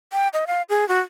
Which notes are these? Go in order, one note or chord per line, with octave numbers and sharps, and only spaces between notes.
G5
D#5
F5
G#4
F#4